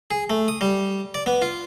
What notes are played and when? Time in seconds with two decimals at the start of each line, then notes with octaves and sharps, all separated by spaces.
0.11 G#4
0.30 A3
0.48 D#6
0.61 G3
1.14 D5
1.26 B3
1.42 F4